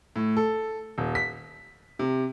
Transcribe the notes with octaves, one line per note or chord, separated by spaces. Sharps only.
A2
A4
D#1
B6
C3